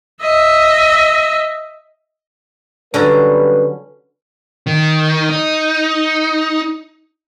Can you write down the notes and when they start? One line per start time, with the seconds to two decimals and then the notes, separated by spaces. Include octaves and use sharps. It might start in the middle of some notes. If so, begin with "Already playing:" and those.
0.22 D#5 E5
2.94 D3 F#3 G3 C#4 B4 A#5
4.67 D#3
5.29 D#4